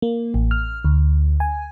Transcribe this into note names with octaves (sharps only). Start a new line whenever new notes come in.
A#3
A1
F6
D2
G#5